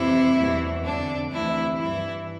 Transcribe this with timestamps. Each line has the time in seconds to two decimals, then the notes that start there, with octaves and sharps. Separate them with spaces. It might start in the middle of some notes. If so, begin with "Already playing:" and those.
Already playing: F2 C3 E3 E4
0.37 E2 B2
0.84 F2 D3 D4
1.31 D2 C3 E3 E4
1.78 G2 E3 E4